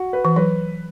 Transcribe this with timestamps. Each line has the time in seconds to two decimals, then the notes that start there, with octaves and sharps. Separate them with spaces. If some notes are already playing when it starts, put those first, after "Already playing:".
Already playing: F#4
0.13 B4
0.25 E3
0.36 F#3 B4